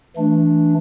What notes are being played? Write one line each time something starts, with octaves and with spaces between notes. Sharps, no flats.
E3 A3 D4